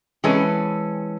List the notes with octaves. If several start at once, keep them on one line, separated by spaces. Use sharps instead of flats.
E3 G#3 C4 C#4 A4 B4